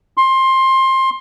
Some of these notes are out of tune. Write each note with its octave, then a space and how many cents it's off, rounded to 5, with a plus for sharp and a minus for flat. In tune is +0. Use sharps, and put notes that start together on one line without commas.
C6 +20